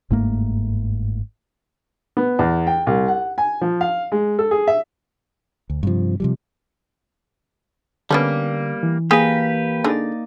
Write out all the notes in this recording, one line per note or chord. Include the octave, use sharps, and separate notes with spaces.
G1 G#2 A3 A#3
B3
E2
G5
C2
F#5
G#5
F3
F5
G#3
A4
G#4
E5
D2
G2 C3 F3
C3 F3 G3
D3 G3 A#3 B3 C#4 A4
E3
A#3 G4 G#4 A#4 B4 F5 G#5
D3 D#4 G#4 D5